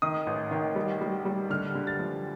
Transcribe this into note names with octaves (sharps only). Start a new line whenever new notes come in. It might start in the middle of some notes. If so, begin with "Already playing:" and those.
D#3 D#6
A1
D#3
G3
G3
G3
D3 F6
D3
A6
F3